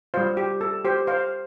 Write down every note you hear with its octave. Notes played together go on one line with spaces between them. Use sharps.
G3 F4 C5 F5
G4
A4
G4 C5
C5 F5